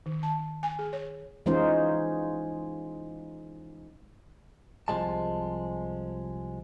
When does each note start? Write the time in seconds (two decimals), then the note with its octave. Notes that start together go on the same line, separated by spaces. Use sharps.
0.06 D#3
0.23 A5
0.63 G#5
0.79 G#4
0.93 C#5
1.46 E3 G#3 C#4 D#4 F4 C5
4.88 C2 F3 G#3 A5